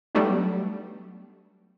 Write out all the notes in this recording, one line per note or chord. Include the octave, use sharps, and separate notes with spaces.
F#3 G3 A3 B3 D4 D#4